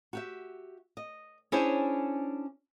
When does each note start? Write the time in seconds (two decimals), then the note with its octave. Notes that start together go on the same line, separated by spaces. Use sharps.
0.13 F#4 G4 E5
0.97 D#5
1.52 C#4 D4 E4 G#4 C5 C#5